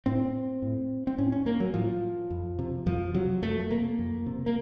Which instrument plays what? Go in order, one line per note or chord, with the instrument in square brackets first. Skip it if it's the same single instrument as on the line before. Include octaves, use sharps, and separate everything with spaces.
[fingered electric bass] A2 C4
A2
C4
A2 C#4
C#4
A#3
F#3
A2 F3
F2
C3
F2 F3
C3 F#3
F2 A3
A3
C3 A#3
F2
C3
A#3